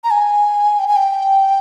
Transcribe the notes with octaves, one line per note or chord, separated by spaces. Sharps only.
A#5
G#5
G5
G#5
G5